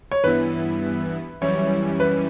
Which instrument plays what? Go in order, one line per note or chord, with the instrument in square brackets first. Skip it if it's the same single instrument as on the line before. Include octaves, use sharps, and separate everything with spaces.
[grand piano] C#5
[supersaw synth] G2 E3 B3 E4 [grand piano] B4
[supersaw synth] F#2 E3 G3 C#4 E4 [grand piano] C#5
[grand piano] B4